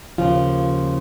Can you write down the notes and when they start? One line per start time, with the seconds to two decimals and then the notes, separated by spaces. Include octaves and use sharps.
0.18 D#2 C#3 F3 F4